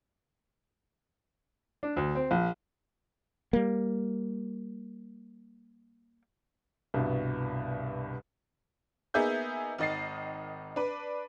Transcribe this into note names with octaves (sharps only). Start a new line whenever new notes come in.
D4
D2
C4
A#1
G3 A#3
C2 G2 B2
A#3 B3 D#4 G#4 E5 G6
G#1 D#3 D#5 A6 C7
D4 B4